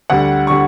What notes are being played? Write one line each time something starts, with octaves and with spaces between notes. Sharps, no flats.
D2 D3 G3 F#5
D3 G3 C#6